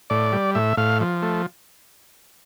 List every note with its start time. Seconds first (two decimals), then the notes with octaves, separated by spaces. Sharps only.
0.10 A2 D5
0.32 G3
0.55 A2 E5
0.77 A2 F5
1.01 F3
1.22 A3